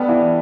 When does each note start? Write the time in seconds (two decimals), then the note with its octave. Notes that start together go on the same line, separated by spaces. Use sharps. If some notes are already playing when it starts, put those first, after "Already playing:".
Already playing: G3 B3 D4 A4
0.09 E3